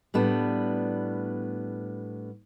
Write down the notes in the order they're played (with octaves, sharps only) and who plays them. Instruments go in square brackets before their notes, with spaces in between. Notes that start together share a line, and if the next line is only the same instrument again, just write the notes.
[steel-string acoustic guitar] A2 G3 B3 D4